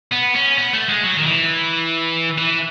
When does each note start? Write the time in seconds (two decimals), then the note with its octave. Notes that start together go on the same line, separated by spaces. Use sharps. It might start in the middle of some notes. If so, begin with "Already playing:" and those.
0.12 B3
0.36 C#4
0.58 B3
0.73 A3
0.89 G#3
1.03 F#3
1.18 D#3
1.26 E3
2.38 E3